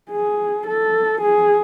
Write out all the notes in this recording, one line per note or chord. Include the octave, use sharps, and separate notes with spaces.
G#4
A4
G#4